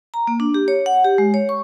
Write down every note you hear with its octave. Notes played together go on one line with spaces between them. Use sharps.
A#5
A#3
D4
G4
C#5
F#5
G4
G#3
C#5
C#6